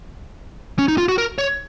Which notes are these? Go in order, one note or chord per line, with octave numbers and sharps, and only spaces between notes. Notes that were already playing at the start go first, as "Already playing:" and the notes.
C#4
D#4
F4
F#4
A#4
C#5